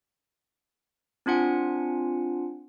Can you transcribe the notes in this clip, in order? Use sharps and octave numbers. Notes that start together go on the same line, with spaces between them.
C4 D4 F4 F#5 G#5